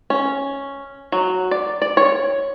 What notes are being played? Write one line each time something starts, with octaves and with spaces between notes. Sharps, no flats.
C#4
F#3
D5
D5
C#5